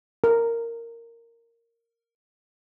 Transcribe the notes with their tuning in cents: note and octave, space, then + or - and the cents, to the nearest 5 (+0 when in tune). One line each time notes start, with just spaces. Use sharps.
A#4 -10